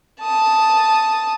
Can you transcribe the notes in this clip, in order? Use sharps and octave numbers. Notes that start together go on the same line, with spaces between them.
A5 D#6